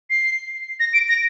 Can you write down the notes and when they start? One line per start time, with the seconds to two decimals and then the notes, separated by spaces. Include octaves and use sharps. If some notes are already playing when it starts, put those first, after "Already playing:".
0.10 C7
0.80 A#6
0.93 D7
1.08 A#6